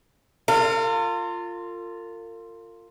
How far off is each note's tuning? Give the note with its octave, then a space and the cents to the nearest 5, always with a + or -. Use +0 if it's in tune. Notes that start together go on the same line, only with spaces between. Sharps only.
F4 +0 A#4 -45